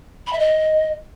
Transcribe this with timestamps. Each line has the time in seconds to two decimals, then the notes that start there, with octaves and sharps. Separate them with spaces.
0.27 B5
0.33 E5
0.39 D#5